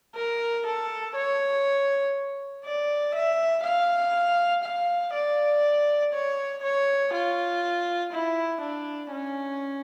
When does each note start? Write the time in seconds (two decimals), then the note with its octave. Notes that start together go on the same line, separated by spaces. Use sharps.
0.16 A#4
0.66 A4
1.15 C#5
2.65 D5
3.15 E5
3.64 F5
4.63 F5
5.13 D5
6.13 C#5
6.63 C#5
7.13 F4
8.13 E4
8.61 D4
9.12 C#4